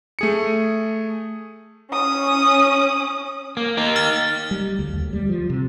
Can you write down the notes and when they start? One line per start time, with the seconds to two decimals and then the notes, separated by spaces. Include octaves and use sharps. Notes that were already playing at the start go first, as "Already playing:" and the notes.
0.19 A3 G#4 C#7
1.92 C#4 D#6
3.57 A#3
3.77 A#3 D#4
3.96 F6 A6
4.51 G3
4.79 D2
4.93 D#2
5.13 G3
5.29 F3
5.50 C3